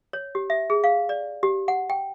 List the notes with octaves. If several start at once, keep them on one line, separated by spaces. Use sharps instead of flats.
C#5
G4
E5
G#4
F5
D5
G4
F#5
G5